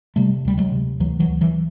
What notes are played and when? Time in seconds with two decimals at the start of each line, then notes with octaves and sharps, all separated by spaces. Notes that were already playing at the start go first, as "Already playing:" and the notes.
0.16 C3 G3 A3
0.45 D2 G3
0.57 F#3 G#3
0.72 C3
1.00 D2 E3 F#3
1.20 E3 F#3
1.27 D2
1.41 E3 F#3